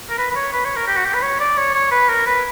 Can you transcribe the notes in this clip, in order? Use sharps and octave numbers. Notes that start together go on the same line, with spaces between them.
A#4
B4
B4
C#5
B4
C#5
A#4
G4
F#4
G4
B4
C#5
D5
C#5
C#5
B4
A#4
B4